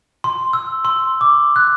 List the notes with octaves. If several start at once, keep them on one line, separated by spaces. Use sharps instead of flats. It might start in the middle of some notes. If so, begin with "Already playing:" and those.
C6
E6
C6
D6
F#6